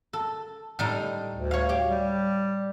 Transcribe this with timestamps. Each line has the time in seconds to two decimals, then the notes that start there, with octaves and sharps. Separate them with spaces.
0.13 A4
0.79 A2 G3 D#4
1.34 D2
1.51 C#5 F5
1.69 G4
1.89 G3